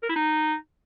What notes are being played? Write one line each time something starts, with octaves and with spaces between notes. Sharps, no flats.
A#4
E4
D#4